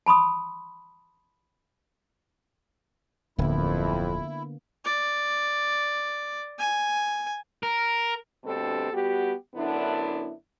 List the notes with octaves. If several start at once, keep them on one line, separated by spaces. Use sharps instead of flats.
A5 B5 C6 D#6
D1 F2 D3 A#3 B3 E4
D5
G#5
A#4
D2 G2 B2 C4 G4 A4
G3 B3 F#4 G4
F#2 D3 B3 D4 E4